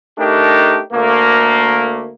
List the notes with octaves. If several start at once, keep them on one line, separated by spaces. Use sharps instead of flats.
A3 D4 D#4 G4 A#4
D2 A3 A#3